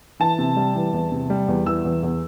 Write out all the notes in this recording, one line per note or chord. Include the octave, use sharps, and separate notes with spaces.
E3 A5
C3
G3
E3
E2
C3
G3
E2
E3 E6
E2
E2